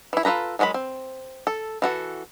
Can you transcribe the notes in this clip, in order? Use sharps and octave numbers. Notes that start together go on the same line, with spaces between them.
E3 E4
F4 A4 B4 A#5
D#3 F#3 G#3 F4 B5
C4
A4
E3 F#4 A4